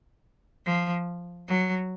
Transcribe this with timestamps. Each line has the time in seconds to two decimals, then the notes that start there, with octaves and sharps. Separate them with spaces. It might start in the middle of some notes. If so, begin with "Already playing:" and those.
0.66 F3
1.48 F#3